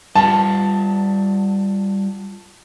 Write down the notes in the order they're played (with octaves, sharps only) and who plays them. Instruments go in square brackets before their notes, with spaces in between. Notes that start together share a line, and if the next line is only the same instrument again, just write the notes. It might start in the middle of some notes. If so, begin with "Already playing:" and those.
[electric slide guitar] G3 F4 [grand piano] A5